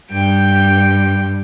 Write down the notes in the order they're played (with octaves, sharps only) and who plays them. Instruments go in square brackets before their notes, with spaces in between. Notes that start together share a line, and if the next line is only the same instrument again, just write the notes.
[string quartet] G2 [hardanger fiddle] G5